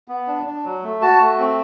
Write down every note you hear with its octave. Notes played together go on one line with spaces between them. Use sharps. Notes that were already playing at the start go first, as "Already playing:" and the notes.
B3
D4
D4
F#3
A3
F#4 A5
A3
C4